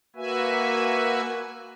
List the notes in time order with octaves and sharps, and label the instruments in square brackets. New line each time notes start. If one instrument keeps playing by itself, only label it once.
[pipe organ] A#3 F#4 B4 E5 G#5